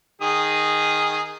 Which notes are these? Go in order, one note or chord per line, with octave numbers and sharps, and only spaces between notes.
D#3 G#4 D#6